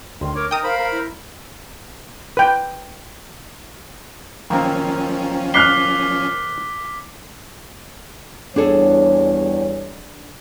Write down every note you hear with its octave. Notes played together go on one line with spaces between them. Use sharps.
D2 D#3 C6
A#4 C#5 D6
D#4 A#4 D#5 G5 A#5 D#6
A#4 C5 F5 B5
A#4
E4
B4 G5
D#3 F3 A#3 C4 C#4
D6 F6 F#6 B6 C7 G7
E2 G3 D4 G#4 A4 C#5